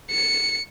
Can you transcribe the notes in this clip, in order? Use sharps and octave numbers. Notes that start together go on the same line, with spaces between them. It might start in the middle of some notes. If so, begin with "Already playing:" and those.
C#7